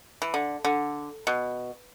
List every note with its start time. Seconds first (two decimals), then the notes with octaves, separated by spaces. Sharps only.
0.22 E3
0.34 D3
0.65 D3
1.27 B2